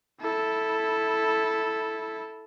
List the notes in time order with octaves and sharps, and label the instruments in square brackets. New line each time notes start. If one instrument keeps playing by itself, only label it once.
[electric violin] E4 A4